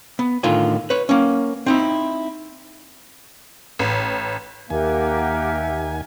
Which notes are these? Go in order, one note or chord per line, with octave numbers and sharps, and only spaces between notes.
B3
A2 D3 D#3 F4 G#5
B4 C#5
A#3 C#4
C4 D#4 E4
A1
D#2 A#3 G4 A#4 E5 F#5 G#5